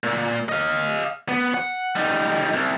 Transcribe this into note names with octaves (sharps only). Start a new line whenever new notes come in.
A#2
D#5 F5
B3
F#5
G3 D#4
C2